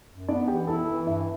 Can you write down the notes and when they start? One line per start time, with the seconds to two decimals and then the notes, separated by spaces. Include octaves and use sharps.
0.09 F#2
0.28 B3 D4 D5
0.47 E3 G4 G5
0.67 E4 A4 A5
0.87 E3
1.06 G2 E4 E5